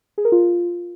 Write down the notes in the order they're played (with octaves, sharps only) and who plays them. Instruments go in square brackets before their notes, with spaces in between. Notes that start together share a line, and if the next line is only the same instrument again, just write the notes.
[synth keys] G#4
A#4
F4